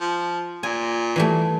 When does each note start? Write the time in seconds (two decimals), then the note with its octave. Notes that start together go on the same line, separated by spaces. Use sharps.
0.01 F3
0.63 A#2 G#5
1.16 E3 G3 A3